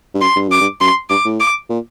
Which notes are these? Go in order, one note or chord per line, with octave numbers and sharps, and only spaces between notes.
G2
F#2 C6
G2
F#2 D6
G2
F#2 C6
G2 D6
A2
D6
A#2